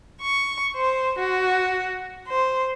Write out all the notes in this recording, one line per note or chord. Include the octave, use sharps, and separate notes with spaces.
C#6
C5
F#4
C5